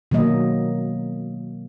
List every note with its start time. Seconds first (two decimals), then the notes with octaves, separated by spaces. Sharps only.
0.11 B2 D#3 F#3 A#3 D#5